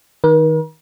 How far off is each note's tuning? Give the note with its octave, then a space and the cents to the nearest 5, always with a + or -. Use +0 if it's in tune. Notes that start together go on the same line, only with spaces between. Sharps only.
D#3 +10 A#4 +45